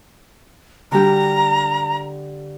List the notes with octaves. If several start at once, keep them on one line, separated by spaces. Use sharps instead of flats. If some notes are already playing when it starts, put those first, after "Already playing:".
D3 G3 G4 A#5